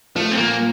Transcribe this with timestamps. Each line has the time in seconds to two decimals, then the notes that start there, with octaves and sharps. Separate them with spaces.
0.16 F3 A3
0.32 C4
0.37 A#2 A#3